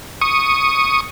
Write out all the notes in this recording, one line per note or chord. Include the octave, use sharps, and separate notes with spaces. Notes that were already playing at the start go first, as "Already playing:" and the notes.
C#6 D#6